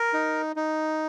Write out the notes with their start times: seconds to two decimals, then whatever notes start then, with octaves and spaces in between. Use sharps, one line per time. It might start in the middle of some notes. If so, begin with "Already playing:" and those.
Already playing: A#4
0.13 D#4
0.56 D#4